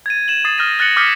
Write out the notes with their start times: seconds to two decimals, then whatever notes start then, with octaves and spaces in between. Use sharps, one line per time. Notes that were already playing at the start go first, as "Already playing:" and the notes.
0.06 G#6 A6 D#7
0.28 D#7 E7 F#7
0.45 D#6 A6 C7
0.58 D#6 F6 G6 A#6 D#7
0.79 F6 F#6 A6 A#6 C#7 F#7
0.96 D6 D#6 F6 G6 B6 C#7